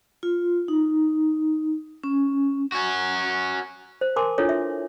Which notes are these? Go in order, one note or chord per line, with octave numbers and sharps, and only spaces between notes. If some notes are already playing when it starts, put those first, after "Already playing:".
F4
D#4
C#4
C#4 F#4
C5
A#4 G#5 A5 C6 D6
D4 E4 F4 A4 C#5
E5